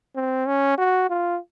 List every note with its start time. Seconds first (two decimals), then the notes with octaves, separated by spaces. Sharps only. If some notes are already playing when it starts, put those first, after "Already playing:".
0.16 C4
0.47 C#4
0.78 F#4
1.10 F4